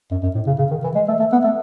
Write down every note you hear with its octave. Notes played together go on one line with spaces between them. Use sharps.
F#2
F#2
A2
C#3
C#3
D#3
E3
G#3
A3
A3
B3
A3